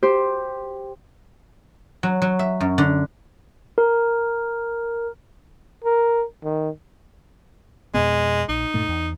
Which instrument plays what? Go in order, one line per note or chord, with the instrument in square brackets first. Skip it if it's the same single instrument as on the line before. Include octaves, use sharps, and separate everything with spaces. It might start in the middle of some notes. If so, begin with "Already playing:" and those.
[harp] G4 C5
[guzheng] F#3
F#3
E5
F#2
D3
[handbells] A#4
[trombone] A#4
D#3
[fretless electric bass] F2 B2 B3 [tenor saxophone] G#3
[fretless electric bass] A#1 [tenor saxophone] D#4
[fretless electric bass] G2 A#2 A3
E2